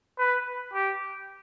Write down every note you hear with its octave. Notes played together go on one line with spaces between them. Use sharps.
B4
G4